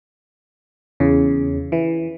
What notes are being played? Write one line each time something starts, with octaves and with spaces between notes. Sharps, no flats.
E2 C#3
E3